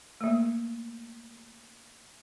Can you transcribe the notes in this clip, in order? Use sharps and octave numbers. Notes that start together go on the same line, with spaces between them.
A3 A#3